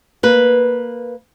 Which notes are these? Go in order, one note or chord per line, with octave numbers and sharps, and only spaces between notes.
A#3 B4